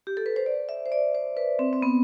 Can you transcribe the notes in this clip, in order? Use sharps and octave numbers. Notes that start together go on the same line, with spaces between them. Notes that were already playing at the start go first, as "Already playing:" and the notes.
G4
A4
B4
C5
D5
E5
C5
D5
C5
B4
C4
C4
B3